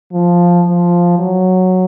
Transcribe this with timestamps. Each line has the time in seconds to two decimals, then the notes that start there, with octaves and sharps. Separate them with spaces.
0.12 F3
0.66 F3
1.19 F#3